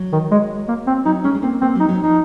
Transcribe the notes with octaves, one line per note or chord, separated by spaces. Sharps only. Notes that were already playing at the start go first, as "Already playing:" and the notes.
Already playing: F#3
D#3
G#3
A#3
C4
F#3 D#4
G#3 C#4
G#3
A#3 C4
A#3 C4
F#3
D#4
F#3
D#4
F3